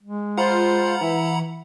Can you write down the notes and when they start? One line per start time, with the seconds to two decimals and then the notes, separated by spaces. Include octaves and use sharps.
0.03 G#3
0.38 F4 C5 F#5 A#5 B5
1.01 E3 E4